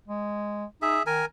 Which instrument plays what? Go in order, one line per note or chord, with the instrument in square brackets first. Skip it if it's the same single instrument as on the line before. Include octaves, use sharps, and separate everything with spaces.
[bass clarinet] G#3
[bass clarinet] D#4 [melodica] G#4 E5
[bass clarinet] D#3 [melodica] A#4 G#5